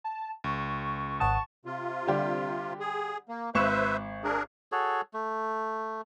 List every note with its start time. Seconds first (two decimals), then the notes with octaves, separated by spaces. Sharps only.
0.04 A5
0.44 C#2 C#6
1.20 G#1 F#5 A5 D#6
1.65 C3 F4
2.07 D3 G3 G4
2.80 G#4
3.29 A#3
3.55 G#1 B4 C5 E5 C#6 E7
4.24 D4 G#4 A#4
4.72 F#4 G#4 A4 C#5
5.13 A3